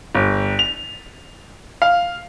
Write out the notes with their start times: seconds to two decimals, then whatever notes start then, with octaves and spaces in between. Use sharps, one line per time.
0.15 G1
0.59 F7
1.82 F5